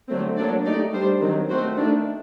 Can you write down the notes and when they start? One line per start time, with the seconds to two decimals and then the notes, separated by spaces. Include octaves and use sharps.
0.09 D3 F#3 A3 C4
0.37 F#3 A#3 D4 A4 D5
0.65 A3 D#4 G4 D5
0.94 G3 D4 G4 C5
1.21 D#3 F#3 C4
1.49 A3 C4 F#4 C5
1.78 D#3 A3 D4